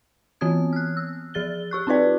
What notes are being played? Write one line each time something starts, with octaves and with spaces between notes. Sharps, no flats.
E3 B3 C4 D#6 G#6
F6 F#6
E6
F3 G#4 A6 G7
G4 C#6 F#6
C4 D#4 F4 B4 D5